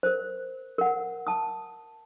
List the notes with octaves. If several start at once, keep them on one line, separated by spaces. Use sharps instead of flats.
A#4 C5
A#4 F#5
A5 D#6